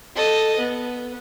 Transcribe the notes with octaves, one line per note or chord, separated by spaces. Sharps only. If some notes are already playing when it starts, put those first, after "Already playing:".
A4 D#5
B3